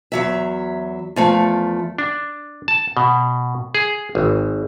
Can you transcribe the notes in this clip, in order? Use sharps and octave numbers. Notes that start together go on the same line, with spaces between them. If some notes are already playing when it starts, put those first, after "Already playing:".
E2 F#3 E5
E2 F3 A3
D4
A5
B2
G#4
G#1